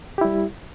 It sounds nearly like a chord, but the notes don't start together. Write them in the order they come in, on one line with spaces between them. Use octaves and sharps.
G4 E4 G3